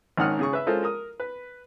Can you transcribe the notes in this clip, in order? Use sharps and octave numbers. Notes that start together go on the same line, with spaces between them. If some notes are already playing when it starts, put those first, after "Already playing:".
G#1 D#3 C#4 F#5 D#6 F6
C#3 G#4 C#6
B4 E5
G#3 C#4 F4 A4 A#4 C5
A#4 D#6
B4